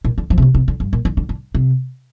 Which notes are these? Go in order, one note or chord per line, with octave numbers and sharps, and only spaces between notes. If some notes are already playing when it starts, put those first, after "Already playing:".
A#2
D3
F3
C3
D3
C3
D3
G2
A#2
D3
D3
D3
C3